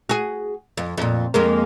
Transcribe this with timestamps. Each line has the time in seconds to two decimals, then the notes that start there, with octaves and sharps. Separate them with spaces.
0.09 F#4 G#4
0.77 F2
0.98 F2 A#2
1.34 F2 G#3 A#3